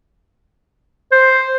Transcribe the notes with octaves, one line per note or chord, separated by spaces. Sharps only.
C5